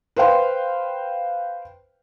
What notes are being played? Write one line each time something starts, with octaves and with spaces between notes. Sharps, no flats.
B4 C5 F5 G5 C6